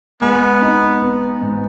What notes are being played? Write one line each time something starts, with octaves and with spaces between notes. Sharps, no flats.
G#3 B3
D#4
B3
G#2